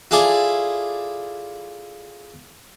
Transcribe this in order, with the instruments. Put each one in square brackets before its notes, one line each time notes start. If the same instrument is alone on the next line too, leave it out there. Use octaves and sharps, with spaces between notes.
[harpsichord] E4 F4 G#4 A4 D5